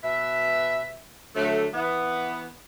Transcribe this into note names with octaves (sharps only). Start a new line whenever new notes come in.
B2 B4 E5
D3 F#3 A3
E3 B3